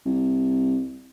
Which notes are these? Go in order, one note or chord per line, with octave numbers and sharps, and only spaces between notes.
C2